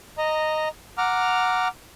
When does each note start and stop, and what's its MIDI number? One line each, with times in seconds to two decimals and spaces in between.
0.18 0.68 75
0.18 0.68 82
0.98 1.68 78
0.98 1.68 82
0.98 1.68 86
0.98 1.68 89